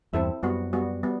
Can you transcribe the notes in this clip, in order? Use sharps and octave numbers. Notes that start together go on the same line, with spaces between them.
E2 G2 C4 E4 A4 E5
F#2 G3 B3 F#4
G3 B3 F#4
G3 B3